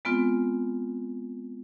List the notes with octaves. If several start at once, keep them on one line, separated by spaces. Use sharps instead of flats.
G#3 B3 C4 F4